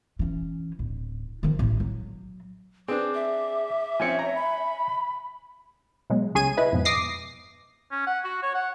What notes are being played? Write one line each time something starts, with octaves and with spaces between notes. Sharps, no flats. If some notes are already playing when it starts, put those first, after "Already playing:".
E3 C#4
D1
D#3 F3
A1 F#3
F#3
C4 D4 G#4 B4 D6
E5
F3 C4 C#4 C#5 G#5 G#6 C#7
A#5
B5
B2 F#3 G#3
C#2 C#4 G#4 G#5 G#6 D#7
E4 B4 D#5
F2 G#2 B2 F3
D6 D#6 A#6 C7
C#4
F#5
F#4
C#5
F#5